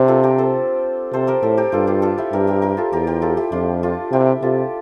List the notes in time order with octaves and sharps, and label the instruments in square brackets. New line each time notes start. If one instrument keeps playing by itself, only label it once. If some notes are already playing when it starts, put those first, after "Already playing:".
Already playing: [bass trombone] C3 [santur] C4 D4
[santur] F4 A4
G4 A#4
A4 C5
[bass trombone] C3 [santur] A4 C5
[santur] G4 A#4
[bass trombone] A2 [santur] A4 C5
[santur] G4 A#4
[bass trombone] G2 [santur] F4 A4
[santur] D4 F4
F4 A4
E4 G4
[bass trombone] G2 [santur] G4 A#4
[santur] G4 A#4
G4 A#4
F4 A4
[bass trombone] E2 [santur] G4 A#4
[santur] G4 A#4
F4 A4
E4 G4
[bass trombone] F2 [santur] D4 F4
[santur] D4 F4
[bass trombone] C3 [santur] E4 G4
[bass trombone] C3 [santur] F4 A4